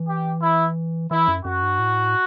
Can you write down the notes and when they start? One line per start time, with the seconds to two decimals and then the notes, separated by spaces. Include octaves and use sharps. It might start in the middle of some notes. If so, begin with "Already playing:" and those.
Already playing: E3
0.08 G4
0.41 E4
1.11 E3 E4
1.28 F#2
1.45 F#2 F#4
1.62 G2
1.79 A2